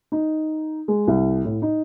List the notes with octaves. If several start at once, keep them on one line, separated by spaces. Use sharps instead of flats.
D#4
G#3
C2
A2
D#4